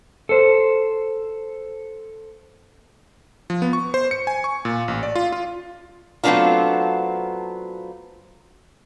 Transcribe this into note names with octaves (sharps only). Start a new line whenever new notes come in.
A4 C5
F3
B3
C#6
C5
C#7
G#5
C#6
A#2
A1
D5
F4
F4
F#3 A3 B3 C4 D4 F4